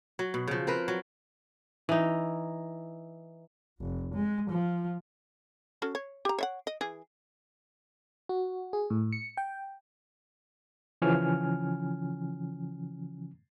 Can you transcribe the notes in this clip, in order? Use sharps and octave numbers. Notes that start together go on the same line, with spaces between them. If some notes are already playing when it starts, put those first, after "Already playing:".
F#3
B2
C#3 F3
C4 A#4 B4
F#3
E3 D#4
F1
G#3
F3
C#4 F#4 A4
C#5
G4 A#5
C#5 E5 F#5
D#5
E3 G#4
F#4
G#4
A2
C#7
G5
C#3 E3 F3 C#4 G#5 F6